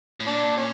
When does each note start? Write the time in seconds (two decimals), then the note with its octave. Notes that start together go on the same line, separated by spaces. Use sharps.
0.20 A2
0.27 A#2 D4
0.57 C#4